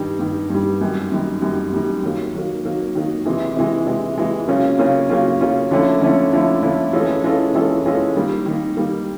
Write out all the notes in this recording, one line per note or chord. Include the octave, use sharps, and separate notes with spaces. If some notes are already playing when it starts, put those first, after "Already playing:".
Already playing: G2 D#3 G3
G2 D#3 G3
G2 D#3 G3
F#2 D#3 G3
F#2 D#3 G3
F#2 D#3 G3
F#2 D#3 G3
D#3 F#3 A#3
D#3 F#3 A#3
D#3 F#3 A#3
D#3 F#3 A#3
C3 E3 G#3
C3 E3 G#3
C3 E3 G#3
C3 E3 G#3
C#3 F#3 A#3 C#4 F4
C#3 F#3 A#3 C#4 F4
C#3 F#3 A#3 C#4 F4
C#3 F#3 A#3 C#4 F4
D3 F3 A3 C#4 E4
D3 F3 A3 C#4 E4
D3 F3 A3 C#4 E4
D3 F3 A3 C#4 E4
E3 G#3 C#4 F4 A4
E3 G#3 C#4 F4 A4
E3 G#3 C#4 F4 A4
E3 G#3 C#4 F4 A4
D#3 G3 A#3
D#3 G3 A#3
D#3 G3 A#3